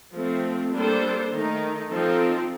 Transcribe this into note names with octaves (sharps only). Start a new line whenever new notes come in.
F3 A3 C4
G3 A#3 D4 A4 C5
D#3 A3 D#4
F3 C4 D#4 A4